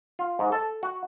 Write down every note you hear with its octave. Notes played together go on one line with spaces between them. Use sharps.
F4
G#2
A4
F#4